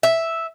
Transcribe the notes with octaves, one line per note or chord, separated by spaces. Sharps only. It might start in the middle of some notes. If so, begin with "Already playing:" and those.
E5